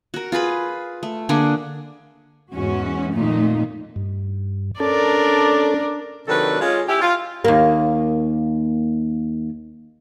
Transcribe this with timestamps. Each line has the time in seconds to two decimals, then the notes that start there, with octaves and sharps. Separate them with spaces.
0.14 F#4 A#4
0.32 F4 G#4 B4 B5
1.03 A3
1.29 D3 A#3 D4 G#4
2.52 E2 G#2 C#4 F#4
3.14 F2 A#2 D#3 A3 D#4
3.96 G2
4.80 C#4 D4 A4 A#4 D5 A5
6.28 C3 D#3 F#3 D4 A4 B4
6.60 G#3 C#4 F4
6.88 C#4 E4 G4
7.01 F4
7.45 D#2 A#3